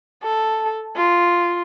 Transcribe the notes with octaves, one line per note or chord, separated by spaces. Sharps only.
A4
F4